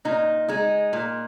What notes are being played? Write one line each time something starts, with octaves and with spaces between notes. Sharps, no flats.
A#2 D#4
G#3 D#4
A#2